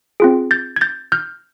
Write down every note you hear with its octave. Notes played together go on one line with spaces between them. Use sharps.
C4 F4 G#4
G6 A6
G#6
G6 A6
F6 G6